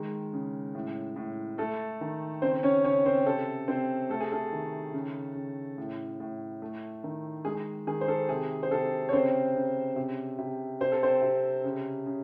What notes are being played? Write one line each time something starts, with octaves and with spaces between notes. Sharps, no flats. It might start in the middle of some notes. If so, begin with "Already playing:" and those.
Already playing: D#3 G#3
C#3
A2
A2
A3 A4
D#3
C#3 C4 C5
C#4 C#5
C#3 C#4 C#5
C4 C5
C3 A4
C3 C4 C5
A3 A4
G#4
A4
D#3
C#3
C#3
A2
A2
A3
D#3
G#3 G#4
D#3 G#4
C5
A4
C3 G#4
C5
C3 A4
C#5
C#3 C4 C5
C#3
C3
C3
C3 C5
A4
C4 C5
C3
C#3
C#3